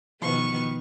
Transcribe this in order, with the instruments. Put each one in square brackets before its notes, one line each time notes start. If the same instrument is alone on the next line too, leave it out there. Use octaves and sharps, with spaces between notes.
[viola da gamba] B2 D#3 B3 [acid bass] F3 [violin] C#6